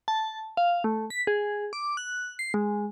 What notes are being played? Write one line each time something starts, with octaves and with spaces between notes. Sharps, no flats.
A5
F5
A3
B6
G#4
D6
F#6
C7
G#3